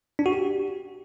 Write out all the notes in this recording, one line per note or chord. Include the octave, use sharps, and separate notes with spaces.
D4
F#4
G4